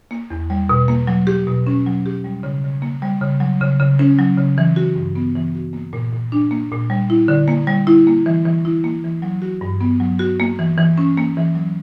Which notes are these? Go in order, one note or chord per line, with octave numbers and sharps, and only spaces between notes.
A#3
E2
G3
B2
A#3
F#3
G4
B2
C#4
F#3
G4
G3
C#3
C#3
A#3
G3
C#3
F#3
C#3
C#3
C#4
F#3
C#3
E3
F#4
G2
B3
E3
F#4
A#3
A#2
A#2
D4
A#3
A#2
G3
E4
D3
A#3
G3
E4
A#3
E3
E3
E4
A#3
E3
F#3
F#4
G2
B3
F#3
F#4
A#3
E3
E3
C#4
A#3
E3
F#3